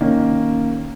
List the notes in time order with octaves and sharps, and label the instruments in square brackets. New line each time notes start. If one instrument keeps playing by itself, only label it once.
[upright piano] D#3 A#3 C#4